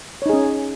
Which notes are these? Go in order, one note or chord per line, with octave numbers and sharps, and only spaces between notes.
C#4 D#4 G#4 C#5